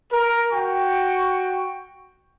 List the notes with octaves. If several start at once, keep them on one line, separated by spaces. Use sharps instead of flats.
A#4
F#4 G5 C#6